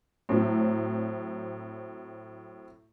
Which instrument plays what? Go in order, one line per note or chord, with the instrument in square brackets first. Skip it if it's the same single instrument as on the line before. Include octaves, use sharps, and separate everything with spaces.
[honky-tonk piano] A2 F#3 C4